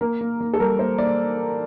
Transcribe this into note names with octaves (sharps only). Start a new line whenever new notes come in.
A#3 A#4
A#3
A#3
A4
G3 A#4
A#3 C5
A#3 D5